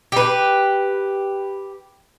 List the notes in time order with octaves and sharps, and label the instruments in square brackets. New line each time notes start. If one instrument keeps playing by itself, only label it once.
[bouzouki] G4 B4